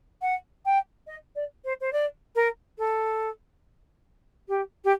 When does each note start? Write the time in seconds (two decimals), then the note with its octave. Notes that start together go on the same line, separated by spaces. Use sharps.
0.22 F#5
0.65 G5
1.07 D#5
1.35 D5
1.65 C5
1.81 C5
1.92 D5
2.35 A#4
2.78 A4
4.48 G4
4.84 G4